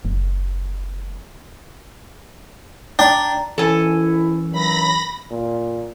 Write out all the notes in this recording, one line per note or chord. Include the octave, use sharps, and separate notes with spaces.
F#1
D4 G5 A#5
D2 D#3 E3 C#4 E4 A4 G#5
G2 D#3 F#3 B5 A#6
A#2